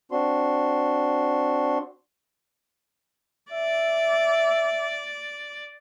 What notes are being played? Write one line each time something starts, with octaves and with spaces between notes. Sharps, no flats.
C4 D4 F#4 C6
D5 E5